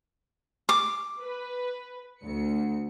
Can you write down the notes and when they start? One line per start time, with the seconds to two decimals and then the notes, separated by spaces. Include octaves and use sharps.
0.69 D6
1.22 B4
2.21 D2 C#7